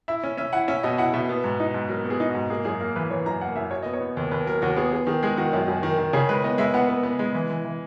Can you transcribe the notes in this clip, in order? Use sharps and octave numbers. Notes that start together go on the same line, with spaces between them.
E4 E5
C#4
C#4 E5
E4 F#5
C#4 E5
B2 D#5
E4 F#5
B2 E5
B3
G#2
D#4
G#2
F#3 A#4
B3
G#4
D#4
F#4
G#2
A#3 G#4
F#2 G#4
A#3 A#4
E3 B4
E3 C#5
F#2 A#5
A#3 F#5
F#2 E5
F#3 C#5
B3 D#5
C#5
B3
D#2
D#2 B4
F#3 A#4
D#2 F#4
B3 G#4
B3 G#4
D#3 G#4
G#3 G#4
D#3 F#4
F#2
F#2
D#3
D#3
C#3 G#4
G#3 B4
B3 D#5
G#3 E5
B3 F#5
B3
B3
G#3
E3
E3
E3